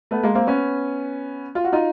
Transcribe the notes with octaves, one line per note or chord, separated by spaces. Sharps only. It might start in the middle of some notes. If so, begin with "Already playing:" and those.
A3 B3
G#3 A#3
A#3 C4
B3 C#4
F4
F#4
D#4 F4